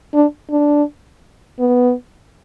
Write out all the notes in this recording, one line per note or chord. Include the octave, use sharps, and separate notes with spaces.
D4
D4
B3